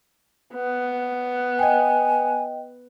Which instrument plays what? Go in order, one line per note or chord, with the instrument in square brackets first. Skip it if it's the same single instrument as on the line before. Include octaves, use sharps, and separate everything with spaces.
[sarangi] B3
[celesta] D#5 G5 [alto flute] G#5